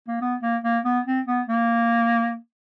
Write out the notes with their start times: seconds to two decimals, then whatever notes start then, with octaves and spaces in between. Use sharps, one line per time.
0.08 A#3
0.21 B3
0.42 A#3
0.64 A#3
0.85 B3
1.06 C4
1.27 B3
1.48 A#3